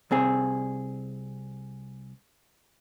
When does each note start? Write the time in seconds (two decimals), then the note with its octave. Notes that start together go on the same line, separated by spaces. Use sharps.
0.11 C2 C4 G#4